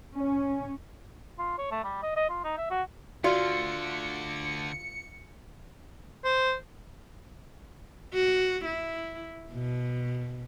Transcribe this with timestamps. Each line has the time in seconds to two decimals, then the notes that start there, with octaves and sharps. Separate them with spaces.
0.15 C#4
1.39 F4
1.59 C#5
1.71 A3
1.84 G3
2.03 D#5
2.17 D#5
2.30 F4
2.45 D#4
2.58 E5
2.71 F#4
3.24 D2 D3 F4 F#4 D5 C#7
6.24 C5
8.14 F#4
8.65 E4
9.53 B2